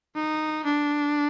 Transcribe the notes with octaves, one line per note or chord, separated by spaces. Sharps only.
D#4
D4